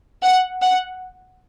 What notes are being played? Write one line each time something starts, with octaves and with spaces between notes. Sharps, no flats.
F#5
F#5